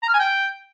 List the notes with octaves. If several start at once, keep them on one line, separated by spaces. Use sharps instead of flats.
A#5
F6
G#5
G5